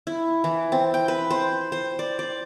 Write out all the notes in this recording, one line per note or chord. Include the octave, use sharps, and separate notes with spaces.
E4
E3
C4
G5
B4
C5
C5
D5
D5